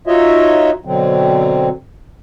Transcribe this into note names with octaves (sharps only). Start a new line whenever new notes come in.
D#4 F4 F#4 C#5 D#5 E5
B2 D3 F#3 C4